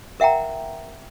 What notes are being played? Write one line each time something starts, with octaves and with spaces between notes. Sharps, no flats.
A#4 E5 F#5 G5 A#5